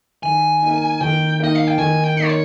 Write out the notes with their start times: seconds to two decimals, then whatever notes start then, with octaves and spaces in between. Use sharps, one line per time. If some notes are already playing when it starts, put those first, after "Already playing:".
0.23 D#3 G#5
0.62 A#3 D#4
1.01 D#3 G5
1.40 A#3 D#4 D#5
1.55 F5
1.67 G5
1.78 D#3 G#5
2.04 G5
2.16 A#3 D#4
2.25 C5
2.29 C#5